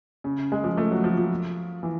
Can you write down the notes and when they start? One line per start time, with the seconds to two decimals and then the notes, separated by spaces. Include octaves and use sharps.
0.24 C#3
0.52 G#3
0.64 F3
0.77 A3
0.91 F#3
1.04 F3
1.17 F3
1.83 E3